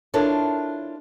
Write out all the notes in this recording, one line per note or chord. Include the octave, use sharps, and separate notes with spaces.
D4 E4 F4 A4 A#4 C#5